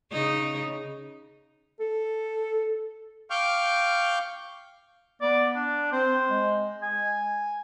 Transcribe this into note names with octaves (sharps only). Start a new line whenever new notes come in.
C#3 D#4
A4
F5 G5 C#6 D6 F6 G6
B3 D5
D4
C4 C5
G#3
G#5